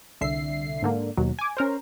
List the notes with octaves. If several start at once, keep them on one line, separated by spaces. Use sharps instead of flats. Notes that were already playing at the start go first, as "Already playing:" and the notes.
C2 D3 E5 C7
G#2 D3 A#3
D#2 B2 F#3
G#5 D6
C#4 A#4 C5